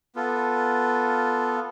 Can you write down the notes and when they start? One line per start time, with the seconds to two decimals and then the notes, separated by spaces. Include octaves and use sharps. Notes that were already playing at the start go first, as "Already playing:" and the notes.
0.15 B3 F4 A4